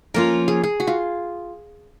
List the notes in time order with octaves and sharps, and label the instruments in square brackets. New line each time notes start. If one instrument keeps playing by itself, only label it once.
[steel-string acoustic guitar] F3 A#3 C#4 F4 [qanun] A#4
[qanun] G#4
G#4
F#4
F4